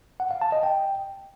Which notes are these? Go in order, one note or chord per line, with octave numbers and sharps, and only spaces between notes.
F#5
F5
A5
D#5
G5